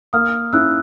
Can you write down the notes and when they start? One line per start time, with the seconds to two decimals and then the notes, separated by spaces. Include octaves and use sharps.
0.13 A#3 D#6 F6
0.53 C#4 E4 E6 F#6